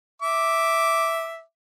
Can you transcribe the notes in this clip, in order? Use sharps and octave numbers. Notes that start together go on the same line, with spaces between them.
E5 D6